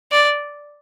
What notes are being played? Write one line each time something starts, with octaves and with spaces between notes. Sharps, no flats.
D5